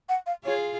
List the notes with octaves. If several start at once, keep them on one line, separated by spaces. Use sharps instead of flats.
F#5
F5
F4 G#4 C#5